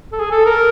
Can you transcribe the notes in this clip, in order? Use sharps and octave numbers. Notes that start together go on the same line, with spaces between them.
A4
G#4
A4
A#4